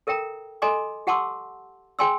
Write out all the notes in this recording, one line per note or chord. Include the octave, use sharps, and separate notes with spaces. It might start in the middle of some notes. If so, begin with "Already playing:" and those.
A4 A#4 E5 G5 A#5
A4 D#5 G#5 A#5 C6 D6
G4 F#5 A5 C6 D6 E6
G#4 G5 G#5 C6 E6